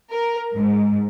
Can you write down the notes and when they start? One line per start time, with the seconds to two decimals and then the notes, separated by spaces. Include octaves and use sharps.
0.11 A#4
0.55 G#2